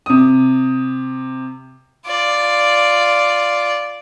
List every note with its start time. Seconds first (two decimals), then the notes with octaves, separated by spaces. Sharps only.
0.06 C3 D#6
2.07 F4 D5